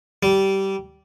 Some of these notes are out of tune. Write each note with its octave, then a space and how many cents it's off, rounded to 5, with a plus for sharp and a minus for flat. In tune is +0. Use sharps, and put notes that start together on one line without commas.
G3 -15